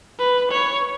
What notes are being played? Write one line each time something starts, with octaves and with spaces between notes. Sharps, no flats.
B4
C#5